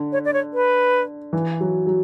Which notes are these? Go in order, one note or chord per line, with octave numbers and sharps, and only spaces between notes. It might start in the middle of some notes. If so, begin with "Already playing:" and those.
Already playing: D3
C#5
D5
C#5
B4
E3
F#3
F#3